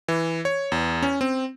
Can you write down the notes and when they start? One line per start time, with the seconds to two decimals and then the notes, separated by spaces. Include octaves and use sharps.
0.08 E3
0.45 C#5
0.72 E2
1.03 C#4
1.21 C4